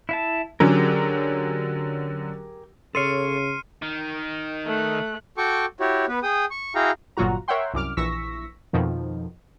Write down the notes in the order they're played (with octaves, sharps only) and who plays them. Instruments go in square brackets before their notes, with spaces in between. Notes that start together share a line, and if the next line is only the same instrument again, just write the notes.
[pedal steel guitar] E4 E5 A5
[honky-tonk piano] D3 F#3 C#4 [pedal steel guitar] G4 G#4 A#4
[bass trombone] C#3 [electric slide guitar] A4 C#5 [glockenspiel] C6 C#7 [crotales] F6 C7 D#7
[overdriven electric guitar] D#3
[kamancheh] A3 F#6
[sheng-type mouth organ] F#4 A4 G5 C#6 D6
E4 F#4 G4 C#5
B3 B4
G#4 G5 D#6
C#6
E4 F#4 G#4 F5 G5 A#5
[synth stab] G1 A#2 F#3 F4 F#4 A#5
A#4 C#5 E5 F#5 G5 C6
C2 F#2 D6 F6
A#1 E3 C#6 E6 A#6 B6
F2 B2 D#3 F3